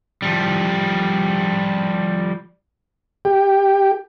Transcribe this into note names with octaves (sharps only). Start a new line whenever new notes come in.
F3 G3
G4